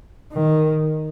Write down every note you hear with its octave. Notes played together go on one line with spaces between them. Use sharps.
D#3